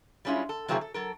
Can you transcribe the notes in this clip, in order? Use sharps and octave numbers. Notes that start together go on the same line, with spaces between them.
G3 G#3 C#4 E4 F4
A4
C3 F#3 A#3 C4 E4 G#4
A4
F#3 A4 A#4